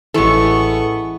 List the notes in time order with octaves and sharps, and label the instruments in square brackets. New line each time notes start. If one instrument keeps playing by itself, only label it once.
[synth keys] A1 A4 [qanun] E3 G#3 [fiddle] B3 C#6